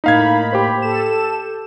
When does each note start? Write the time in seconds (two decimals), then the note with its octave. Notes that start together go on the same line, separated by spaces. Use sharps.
0.04 A2 A#3 D#4 F5 B5 G#6
0.53 G4 C5
0.82 A4 E7